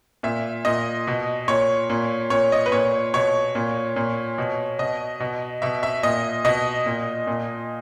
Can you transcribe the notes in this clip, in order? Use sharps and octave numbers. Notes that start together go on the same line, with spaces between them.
A#2 E5
A#2 D#5
B2
A#2 C#5
A#2
A#2 C#5
D#5
B4
A#2 C#5
B2 C#5
A#2
A#2
B2
B2 D#5
B2
B2 E5
E5
A#2 D#5
B2 D#5
A#2
A#2